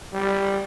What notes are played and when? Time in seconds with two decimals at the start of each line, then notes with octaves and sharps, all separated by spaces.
0.13 G3